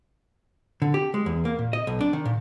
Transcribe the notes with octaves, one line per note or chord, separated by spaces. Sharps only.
D3
G4
G#3
E2
A#3
A#2
D#5
B1
D4
D#3
A#2